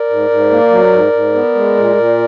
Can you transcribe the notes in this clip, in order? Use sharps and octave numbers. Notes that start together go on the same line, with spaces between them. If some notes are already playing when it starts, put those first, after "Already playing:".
Already playing: A#4 D5
G#2
G#2
A#3
F#3
G#2
G#2
B3
G#3
A#2
A#2